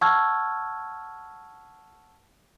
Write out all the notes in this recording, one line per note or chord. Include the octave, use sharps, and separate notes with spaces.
F#5 A5 C#6 E6 F6 G#6